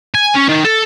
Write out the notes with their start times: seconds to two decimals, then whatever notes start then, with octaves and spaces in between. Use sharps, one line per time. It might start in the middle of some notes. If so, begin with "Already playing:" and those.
0.14 G#5
0.35 C#4
0.48 D#3
0.64 A4